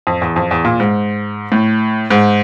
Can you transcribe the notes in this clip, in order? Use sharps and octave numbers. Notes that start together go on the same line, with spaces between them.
F2
E2
F2
E2
A#2
G#2
A2
G#2